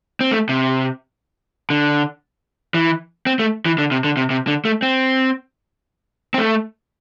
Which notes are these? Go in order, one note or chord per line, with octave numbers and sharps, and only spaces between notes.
C4
A3
C3
D3
E3
C4
A3
E3
D3
C3
D3
C3
C3
D3
A3
C4
C4
A3